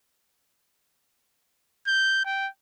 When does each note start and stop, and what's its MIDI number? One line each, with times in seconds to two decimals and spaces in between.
1.87 2.21 91
2.25 2.48 79